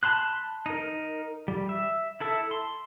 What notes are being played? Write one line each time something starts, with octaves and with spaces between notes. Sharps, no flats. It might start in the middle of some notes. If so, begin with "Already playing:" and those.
A5 B5 C6 F#6
D#4 A#4
G3
E5
E4 A4 E5
C6